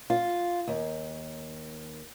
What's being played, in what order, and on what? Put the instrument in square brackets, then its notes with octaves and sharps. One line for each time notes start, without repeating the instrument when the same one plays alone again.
[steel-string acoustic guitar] F4
D#2